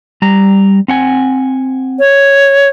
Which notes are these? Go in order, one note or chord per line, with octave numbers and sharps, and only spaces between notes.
G3 A#5
C4 F#5 G#5
C#5